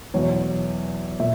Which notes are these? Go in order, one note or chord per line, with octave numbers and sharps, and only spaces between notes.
E2 B2 F#3 C#5
A#2 E5